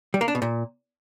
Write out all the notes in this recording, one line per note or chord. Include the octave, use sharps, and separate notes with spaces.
G3
A#3
D4
B2
A#2